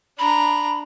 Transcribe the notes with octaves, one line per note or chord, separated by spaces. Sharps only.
D4 A#5 B5